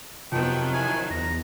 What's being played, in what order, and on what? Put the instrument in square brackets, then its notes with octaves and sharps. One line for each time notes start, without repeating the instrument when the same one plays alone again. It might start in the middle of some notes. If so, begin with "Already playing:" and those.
[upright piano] F2 B3 [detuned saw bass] C3 [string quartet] D#3 F3 F#3 [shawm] G5
[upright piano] E4 [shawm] G#5
[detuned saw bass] E2 [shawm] A#5